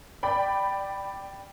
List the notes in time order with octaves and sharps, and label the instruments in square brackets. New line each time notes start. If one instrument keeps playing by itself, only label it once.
[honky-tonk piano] D5 G5 B5